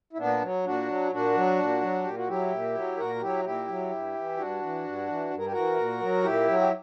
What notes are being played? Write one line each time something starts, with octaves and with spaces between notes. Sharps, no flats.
E4
A#2 B3 D4
F#3
A#2 D4 F#4
F#3
A#2 D4 F#4
F#3
A#2
F#3
A#2 G4
F#4
F#3 E4 G4
A#2
F#3
A#2 F#4 A#4
F#4
F#3 E4 G4
A#2 E4 G4
F#3
G2
E3
G2 D4 F#4
E3
G2
E3
G2
A#4
G4
E3 F#4 A#4
A#2
F#3
A#2 E4 G4
F#3
G4